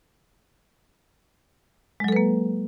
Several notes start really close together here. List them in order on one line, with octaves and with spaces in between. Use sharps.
G#3 F#3 A4 B4 A#3